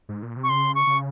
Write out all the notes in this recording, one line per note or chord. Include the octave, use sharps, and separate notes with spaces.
G#2
A#2
C3
C#6
C#3 C6
C#6
C#3